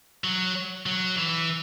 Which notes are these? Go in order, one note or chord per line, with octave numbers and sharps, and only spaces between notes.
F#3
F#3
E3